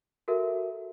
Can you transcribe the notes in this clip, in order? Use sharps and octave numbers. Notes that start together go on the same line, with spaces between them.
F#4 A4 A#4 E5